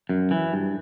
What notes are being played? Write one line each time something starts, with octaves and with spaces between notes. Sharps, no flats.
F#2
E3
G2